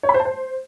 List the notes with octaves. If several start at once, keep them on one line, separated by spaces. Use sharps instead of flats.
C#5
B5
C5
A5
C5